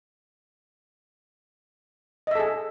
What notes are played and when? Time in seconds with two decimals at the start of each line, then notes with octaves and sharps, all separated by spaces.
2.27 D#5
2.31 E5
2.35 A4
2.39 G#4